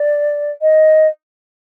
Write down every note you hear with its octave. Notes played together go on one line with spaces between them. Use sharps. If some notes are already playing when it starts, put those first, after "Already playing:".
Already playing: D5
D#5